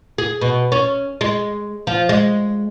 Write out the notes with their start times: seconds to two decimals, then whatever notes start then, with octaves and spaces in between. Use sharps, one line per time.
0.18 G#4
0.41 B2
0.72 C#4
1.21 G#3
1.87 F3
2.09 G#3